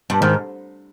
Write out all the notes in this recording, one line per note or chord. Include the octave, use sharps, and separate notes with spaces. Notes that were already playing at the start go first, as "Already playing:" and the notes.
G2
G#2 D#3